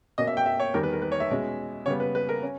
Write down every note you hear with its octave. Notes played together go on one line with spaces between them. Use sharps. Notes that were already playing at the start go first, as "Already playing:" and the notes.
B2 A#3 C#4 D#5
E5
G5
E5
C#5
E2 D#3 G3 A#4
B4
A#4
B4
C#5
E5
B2 G#3 C#4
C#3 G3 B3 C#5
B4
B4
A#4
C#4